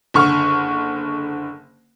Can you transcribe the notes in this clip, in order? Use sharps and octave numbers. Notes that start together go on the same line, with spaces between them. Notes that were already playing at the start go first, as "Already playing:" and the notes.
F#1 D3 C#6 F6